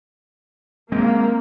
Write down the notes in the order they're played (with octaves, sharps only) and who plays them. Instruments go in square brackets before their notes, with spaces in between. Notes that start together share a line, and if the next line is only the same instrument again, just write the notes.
[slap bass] G#3 C4 [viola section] A#3